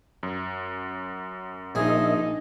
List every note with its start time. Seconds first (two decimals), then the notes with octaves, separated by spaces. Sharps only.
0.23 F#2
1.75 A#1 A#2 D4 D#4 G#4 D#5 E5